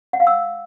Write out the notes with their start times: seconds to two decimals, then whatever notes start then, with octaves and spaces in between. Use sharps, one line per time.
0.13 F#5
0.20 F5
0.27 E6